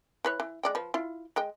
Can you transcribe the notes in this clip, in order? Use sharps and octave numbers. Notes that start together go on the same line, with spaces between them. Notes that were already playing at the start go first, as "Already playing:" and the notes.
E3 B4 C#5
E3
G#3 D5 G5
F3 B4
E4 F4
G#3 D#5 G5